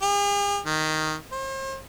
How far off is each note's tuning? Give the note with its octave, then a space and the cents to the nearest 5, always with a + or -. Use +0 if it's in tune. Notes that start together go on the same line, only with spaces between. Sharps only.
G#4 -45
D#3 +5
C5 +40